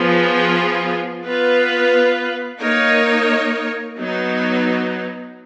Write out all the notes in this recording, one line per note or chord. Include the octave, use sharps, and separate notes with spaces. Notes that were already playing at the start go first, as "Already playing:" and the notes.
Already playing: F3 B3 F4 G#4
B3 F4 B4
A#3 D#4 A#4 C#5
F#3 B3 D#4